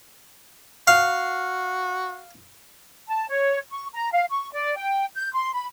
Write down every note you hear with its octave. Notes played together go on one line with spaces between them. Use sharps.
F#4 F5
A5
C#5
C#6
A#5
F5
C#6
D5
G5
G6
C6
B5